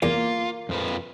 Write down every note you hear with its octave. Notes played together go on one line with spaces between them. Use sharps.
E2 A#3 F4
F2 F3 B4